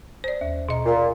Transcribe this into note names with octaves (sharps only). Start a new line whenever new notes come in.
C5 D5
D#2
B2 D#5 A#5
A#2